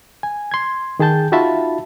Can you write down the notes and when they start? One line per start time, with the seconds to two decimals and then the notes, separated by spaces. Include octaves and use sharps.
0.23 G#5
0.52 C6 G#6
0.99 D#3 G#4 G5 A5 G6
1.32 D#4 F4 F#4 E5 A5 B5